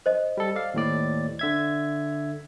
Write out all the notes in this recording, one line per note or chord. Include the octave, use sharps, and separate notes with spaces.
C5 D#5
G3 A4
D5 F5
D#2 A2 D5
D3 E5 G#6